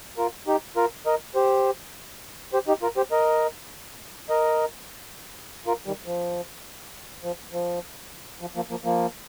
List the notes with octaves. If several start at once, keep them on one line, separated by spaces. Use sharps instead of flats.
F4 A#4
D#4 G4
F4 A#4
A#4 D#5
G4 C5
G4 C5
D#4 G4
F4 A#4
G4 C5
A#4 D#5
A#4 D#5
F4 A#4
D#3 G3
F3
F3
F3
F3
F3 A#3
F3 A#3
F3 A#3